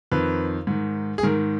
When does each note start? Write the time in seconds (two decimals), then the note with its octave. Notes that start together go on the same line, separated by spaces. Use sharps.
0.12 F2 D#3 B4
0.67 G#2 D#3
1.18 G#4
1.23 G#2 D#3 A#4